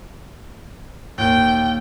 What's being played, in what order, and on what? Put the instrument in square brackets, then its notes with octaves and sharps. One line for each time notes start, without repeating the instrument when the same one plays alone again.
[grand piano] D#2 A#2 [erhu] G5